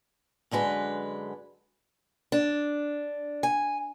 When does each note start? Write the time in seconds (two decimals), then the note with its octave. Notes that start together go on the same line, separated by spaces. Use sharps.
0.51 F#2 D3 G#3 B4
2.32 D4
3.43 G#5